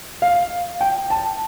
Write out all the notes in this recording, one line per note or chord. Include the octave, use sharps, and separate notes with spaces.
F5
G5
A5